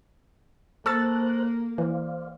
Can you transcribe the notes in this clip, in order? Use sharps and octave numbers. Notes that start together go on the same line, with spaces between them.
A#3 A4 C5 C#6 E6 F#6 A6
E3 C5 D5 F5